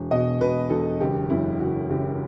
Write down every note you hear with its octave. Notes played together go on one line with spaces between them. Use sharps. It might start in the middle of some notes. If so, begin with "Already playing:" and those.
Already playing: E1
B2 D#5
B2 B4
E1 A4
F#1 G4
F#2 E4
F#1 F#4
F#1 G4